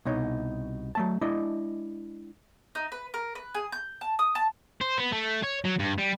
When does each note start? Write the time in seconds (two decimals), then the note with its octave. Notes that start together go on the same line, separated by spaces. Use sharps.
0.05 C2 B2 D#4 C#5
0.95 F#3 A3 A5
1.21 G#3 D4 E4 D#5
2.75 D#4
2.92 B4
3.14 A#4
3.35 B4
3.54 G#4
3.72 G6
4.01 A5
4.19 D#6
4.35 A5
4.81 C5
4.98 B3
5.12 A3
5.44 C#5
5.65 F#3
5.79 G2
5.98 G3